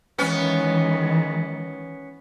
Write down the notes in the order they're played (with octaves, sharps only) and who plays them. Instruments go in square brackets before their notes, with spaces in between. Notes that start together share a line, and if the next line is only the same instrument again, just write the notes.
[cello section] D#3 E3 G#3 [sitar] B3 C#4